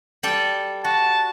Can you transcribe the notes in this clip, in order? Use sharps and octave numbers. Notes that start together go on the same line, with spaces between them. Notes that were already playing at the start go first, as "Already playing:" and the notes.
G3 A4 G5
F#4 A5